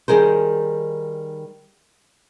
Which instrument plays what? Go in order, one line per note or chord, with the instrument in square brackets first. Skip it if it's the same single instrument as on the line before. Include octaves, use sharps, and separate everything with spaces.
[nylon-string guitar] D#3 G3 G#4 A#4 C5